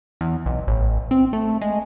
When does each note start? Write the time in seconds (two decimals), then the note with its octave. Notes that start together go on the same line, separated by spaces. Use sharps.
0.21 E2
0.46 B1
0.67 A1
1.11 C4
1.33 A3
1.61 G#3